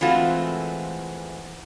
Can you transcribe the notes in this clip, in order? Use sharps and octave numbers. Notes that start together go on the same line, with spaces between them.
E3 G#3 A3 C4 F4 F#4